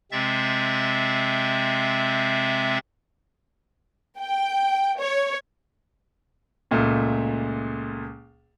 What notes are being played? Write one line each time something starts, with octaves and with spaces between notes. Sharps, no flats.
C3 G#3 C4 E5 A6
G5
C#5
C#2 A#2 A3